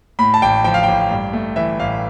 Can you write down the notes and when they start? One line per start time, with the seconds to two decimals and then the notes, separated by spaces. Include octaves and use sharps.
0.19 A2 B5
0.34 A5
0.42 A1 G5
0.64 F3 G5
0.74 F5
0.83 A1 G5
1.11 G2
1.33 A3
1.56 E3 E5
1.79 A1 F5